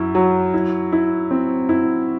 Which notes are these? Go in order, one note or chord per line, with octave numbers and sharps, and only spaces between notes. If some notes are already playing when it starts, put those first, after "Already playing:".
Already playing: F#2 E4
F#3
E4
E4
C4
E4